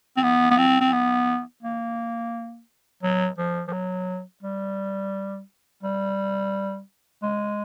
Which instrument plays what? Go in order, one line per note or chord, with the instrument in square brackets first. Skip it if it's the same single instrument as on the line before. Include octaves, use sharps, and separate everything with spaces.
[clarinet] C4
B3
B3
C4
C4
B3
A#3
F#3
F3
F3
F#3
G3
G3
G#3